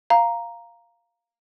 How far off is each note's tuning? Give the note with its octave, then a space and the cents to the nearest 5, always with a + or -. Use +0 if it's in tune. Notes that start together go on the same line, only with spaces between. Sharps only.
F5 +0 A#5 +0